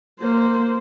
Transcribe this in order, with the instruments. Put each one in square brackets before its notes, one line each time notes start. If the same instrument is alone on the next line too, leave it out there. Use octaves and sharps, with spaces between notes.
[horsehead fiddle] A#3 C5